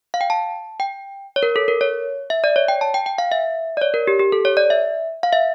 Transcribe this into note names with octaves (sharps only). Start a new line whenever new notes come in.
F5
G5
A5
G5
C#5
A#4
A4
A#4
C#5
E5
D5
C#5
G5
A5
G5
G5
F5
E5
D5
C#5
A#4
G4
G4
A4
C#5
D5
E5
F5
E5